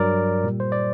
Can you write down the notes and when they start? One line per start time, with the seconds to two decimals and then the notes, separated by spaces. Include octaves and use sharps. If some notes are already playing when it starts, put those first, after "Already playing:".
Already playing: G2 F#3 A#4 D5
0.44 A#2 G3
0.60 C5
0.72 D5